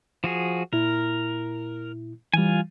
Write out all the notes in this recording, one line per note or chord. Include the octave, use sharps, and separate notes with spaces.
F3 F#4 G#4
A#2 E4 A#4
E3 G3 F4 G#5